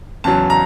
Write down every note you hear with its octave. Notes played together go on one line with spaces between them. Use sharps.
E2 C#3 F#3 A5
A#5